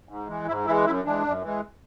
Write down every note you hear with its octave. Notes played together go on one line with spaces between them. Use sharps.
G#2
E3 G#3
G#2 E4
E3 G#3 E4
F#2 E4
E3 G#3 D4
F#2
E3 G#3